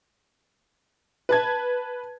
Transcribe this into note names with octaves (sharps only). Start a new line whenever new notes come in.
B4 A5 G#6